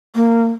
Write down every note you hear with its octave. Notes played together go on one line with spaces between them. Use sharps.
A#3